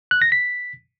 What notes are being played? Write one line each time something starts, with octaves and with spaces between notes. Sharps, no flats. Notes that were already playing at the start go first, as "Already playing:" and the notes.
F#6
A#6
B6